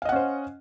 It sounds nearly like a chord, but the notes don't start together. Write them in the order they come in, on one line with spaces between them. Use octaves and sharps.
F5 D#5 F#5 C#4 C5